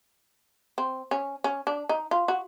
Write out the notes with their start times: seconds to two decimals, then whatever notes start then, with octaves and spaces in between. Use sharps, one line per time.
0.78 C4
1.11 C#4
1.44 C#4
1.67 D4
1.89 D#4
2.11 F4
2.28 F#4